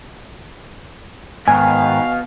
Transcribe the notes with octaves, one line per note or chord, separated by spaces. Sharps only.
G#2 B2 D#3 F5 G#5